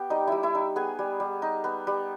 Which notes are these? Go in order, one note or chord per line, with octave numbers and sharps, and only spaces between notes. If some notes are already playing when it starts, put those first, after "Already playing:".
Already playing: B3 G4 G5
G3 D#4 D#5
G3 E4 E5
E4 E5
D#4
B3 G#4 G#5
G3
G3
D#4
B3
G3